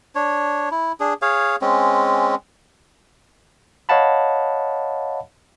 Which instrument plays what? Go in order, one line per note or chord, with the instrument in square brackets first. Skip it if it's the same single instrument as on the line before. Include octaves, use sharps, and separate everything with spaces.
[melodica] D4 C#5
E4
D4 G#4
G#4 C#5 F5
G#3 C4 C#4
[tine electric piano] C#5 D#5 F5 F#5 A5 B5